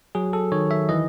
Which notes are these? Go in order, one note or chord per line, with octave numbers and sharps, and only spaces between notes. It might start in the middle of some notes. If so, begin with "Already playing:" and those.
F#3 G#4
A4
D#3 C#5
E5
E3 D#5